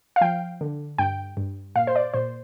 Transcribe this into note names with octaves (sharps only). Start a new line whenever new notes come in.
F5
F3 G5
D3
G2 G5
G2
A#2 F5
C5
D5
A#2 C5